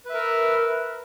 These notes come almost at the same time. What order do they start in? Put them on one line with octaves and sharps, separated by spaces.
B4 E5 A#4